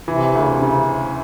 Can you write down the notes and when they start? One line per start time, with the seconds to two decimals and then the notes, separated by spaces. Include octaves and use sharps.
0.08 C3 E3
0.34 D2
0.41 C#3
0.48 C3
0.61 C#3